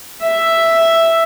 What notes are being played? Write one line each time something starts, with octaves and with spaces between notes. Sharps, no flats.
E5